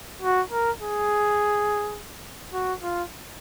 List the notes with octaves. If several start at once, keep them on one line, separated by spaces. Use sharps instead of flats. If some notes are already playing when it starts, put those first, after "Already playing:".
F#4
A#4
G#4
F#4
F4